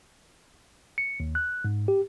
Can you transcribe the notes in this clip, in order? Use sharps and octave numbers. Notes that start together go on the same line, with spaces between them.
C#7
D#2
F#6
G#2
G4